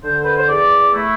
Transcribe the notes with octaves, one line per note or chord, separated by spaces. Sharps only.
D3 C5
B4
C5
E2 D5
A3 E4